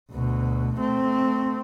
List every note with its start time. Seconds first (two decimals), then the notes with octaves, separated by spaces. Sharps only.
0.12 D2 B2
0.77 A3 C4